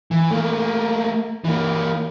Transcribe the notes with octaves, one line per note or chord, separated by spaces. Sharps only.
E3
A3 A#3
E3 A#3